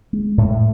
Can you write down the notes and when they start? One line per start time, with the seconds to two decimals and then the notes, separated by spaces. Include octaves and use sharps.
0.13 G#3
0.38 A2